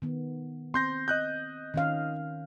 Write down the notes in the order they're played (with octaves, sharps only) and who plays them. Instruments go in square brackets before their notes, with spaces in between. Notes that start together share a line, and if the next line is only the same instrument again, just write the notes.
[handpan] D#3 B3
[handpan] C4 [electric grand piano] C6 G6 A#6
[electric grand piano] D#5 F#6 G6
[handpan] D#3 C#4 F5